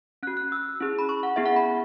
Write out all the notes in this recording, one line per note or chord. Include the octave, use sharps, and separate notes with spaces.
C#4 F#4 F#6
F#6
E6
C#4 E4 G#4
B5
C#6
F#5
B3 E4 G#4 E5
F#5
B5